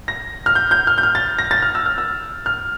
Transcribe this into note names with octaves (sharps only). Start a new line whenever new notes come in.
A#6
F6
G6
G6
F6
G6
F6
A6
A#6
A6
F6
E6
F6
E6
F6